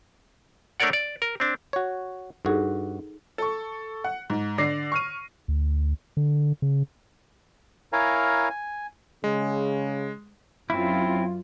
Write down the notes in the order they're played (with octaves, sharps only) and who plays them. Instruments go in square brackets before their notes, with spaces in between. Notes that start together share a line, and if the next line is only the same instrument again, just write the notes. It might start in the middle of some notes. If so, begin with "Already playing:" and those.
[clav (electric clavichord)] A3 D4 A#4 C#5 D5 F#5
D5
A#4
C4 D4
F#4 C#5
[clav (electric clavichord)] G2 F#4 [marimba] D#4 G#4 A4
[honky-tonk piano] A4 C#6
F#5
G#2
D3 D5 A#6 C7
C#6 F6 D#7
[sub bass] D2
D3
C#3
[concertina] E4 A#4 C#5 F5 G#5 A#5
G#5
[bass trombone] C#3 [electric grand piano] G#3
[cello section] F#2 F#3 F4 [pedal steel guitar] C4 E4